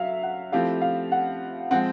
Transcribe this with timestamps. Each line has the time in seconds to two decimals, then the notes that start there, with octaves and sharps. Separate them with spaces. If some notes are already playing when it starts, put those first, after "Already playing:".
Already playing: F#3 E5 F5
0.23 F#5
0.52 F3 A3 C4 E4 G4 F5
0.81 F5
1.12 F#5
1.71 F3 G#3 C4 F#5